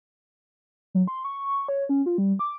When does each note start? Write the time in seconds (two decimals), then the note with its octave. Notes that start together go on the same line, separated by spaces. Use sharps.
0.94 F#3
1.08 C6
1.25 C#6
1.68 C#5
1.89 C#4
2.06 F4
2.18 G3
2.39 D6